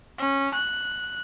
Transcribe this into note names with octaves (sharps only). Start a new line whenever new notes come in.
C#4
F#6